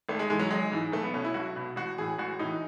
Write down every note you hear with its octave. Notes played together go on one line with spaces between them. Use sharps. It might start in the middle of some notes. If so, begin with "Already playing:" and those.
G#1 A3
G#3
G#2 E3 G#3
F#3
G#1 G#3
G#2 E3
B1 A3
B3
B2 C#4
E4
B1 F#4
B2
A1 F#4
A2 E3 G#4
A1 F#4
A2 E3 D#4